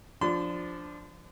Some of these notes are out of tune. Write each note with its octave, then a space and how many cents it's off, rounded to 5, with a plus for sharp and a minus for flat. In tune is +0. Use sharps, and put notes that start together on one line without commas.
F3 +0 D4 +0 C6 -45